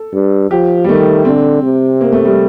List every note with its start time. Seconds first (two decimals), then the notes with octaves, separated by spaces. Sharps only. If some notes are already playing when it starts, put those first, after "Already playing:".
Already playing: A4
0.13 G2
0.51 F3 G4
0.84 G3
0.88 D#3 A3
1.25 D3 C4
1.62 C3
2.01 A#3
2.12 A3
2.25 G3